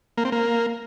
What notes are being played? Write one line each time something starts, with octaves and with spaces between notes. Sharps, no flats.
A#3
C4
A#3